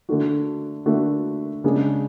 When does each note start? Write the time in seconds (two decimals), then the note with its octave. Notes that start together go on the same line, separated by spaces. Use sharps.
0.09 D3 A3 D4 F#4
0.86 D3 A3 D4 F#4
1.64 C#3 G#3 D4 G#4